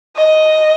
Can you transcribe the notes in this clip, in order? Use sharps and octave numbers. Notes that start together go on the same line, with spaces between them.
D#5